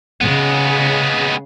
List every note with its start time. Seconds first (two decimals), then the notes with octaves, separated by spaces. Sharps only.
0.21 C#3 G#3 B3